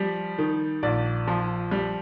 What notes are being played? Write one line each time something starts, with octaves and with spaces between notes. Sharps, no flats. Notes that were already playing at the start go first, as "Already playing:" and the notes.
Already playing: F3 G3
D#3
A#1 D5
F3
G3